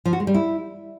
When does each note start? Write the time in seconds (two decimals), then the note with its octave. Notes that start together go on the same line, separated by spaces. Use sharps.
0.05 F3
0.13 F#4
0.20 G#3
0.27 G3
0.34 E4